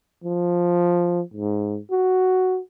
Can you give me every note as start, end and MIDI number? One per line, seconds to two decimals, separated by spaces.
0.24 1.22 53
1.34 1.79 44
1.91 2.60 66